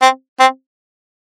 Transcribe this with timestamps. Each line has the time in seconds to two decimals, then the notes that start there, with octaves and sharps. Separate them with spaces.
0.02 C4
0.40 C4